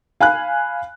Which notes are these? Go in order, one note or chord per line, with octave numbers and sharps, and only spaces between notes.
F5 G#5 B5 F#6